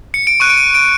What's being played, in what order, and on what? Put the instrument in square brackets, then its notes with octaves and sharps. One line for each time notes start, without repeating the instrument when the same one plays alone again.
[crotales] C#7
D7
C#6 F#6 D#7
D7
D#7
D7